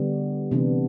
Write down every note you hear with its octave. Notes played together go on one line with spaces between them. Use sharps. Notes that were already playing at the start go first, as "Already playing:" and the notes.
Already playing: D3 G3 B3
C3 E3 B3 D4